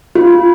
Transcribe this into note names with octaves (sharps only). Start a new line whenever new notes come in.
F4